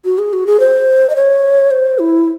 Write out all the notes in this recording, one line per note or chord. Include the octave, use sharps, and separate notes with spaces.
F#4
G#4
F#4
G#4
C5
D#5
C#5
C5
E4